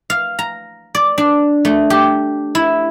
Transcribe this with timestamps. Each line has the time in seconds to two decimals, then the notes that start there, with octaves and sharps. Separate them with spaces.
0.10 F5
0.39 A#5
0.95 D5
1.18 D4
1.65 A3
1.90 G4
2.55 E4